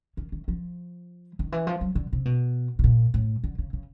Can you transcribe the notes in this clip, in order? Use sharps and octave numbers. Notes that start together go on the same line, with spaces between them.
D#3
D#3
F3
D#3
E3
F3
F#3
D3
C3
B2
B2
A#2
A2
D3
C#3
C#3